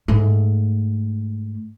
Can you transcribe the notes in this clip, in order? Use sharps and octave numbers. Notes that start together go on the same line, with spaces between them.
G#2 A3